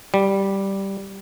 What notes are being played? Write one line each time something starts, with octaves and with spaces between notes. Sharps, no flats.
G3